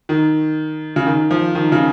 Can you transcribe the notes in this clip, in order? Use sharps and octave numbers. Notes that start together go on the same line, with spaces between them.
D#3
C#3
D#3
F3
D#3
C#3